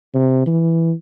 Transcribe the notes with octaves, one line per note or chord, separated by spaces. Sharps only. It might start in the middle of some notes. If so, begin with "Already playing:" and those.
C3
E3